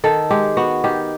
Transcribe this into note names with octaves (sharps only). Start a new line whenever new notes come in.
D#3 A4
G#3 G4
B3 F#4
D#3 G4